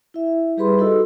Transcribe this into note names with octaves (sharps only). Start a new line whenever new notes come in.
E4 E5
G3 G4 G#4 B4 B5 C6
D#4 F#4 A4 D#5 E6